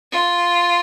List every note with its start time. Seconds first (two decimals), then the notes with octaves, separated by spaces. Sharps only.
0.12 F4